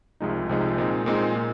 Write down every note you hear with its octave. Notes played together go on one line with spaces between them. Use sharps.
C2 C3 F3 G#3 D#4
C2 C3 F3 G#3 D#4
A#2 G#3 C4 D#4
A#2 G#3 C4 D#4
A#2